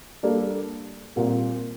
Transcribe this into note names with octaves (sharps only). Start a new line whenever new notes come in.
G3 A#3 D4 A4 D5
A#2 G3 C4 F4 A#4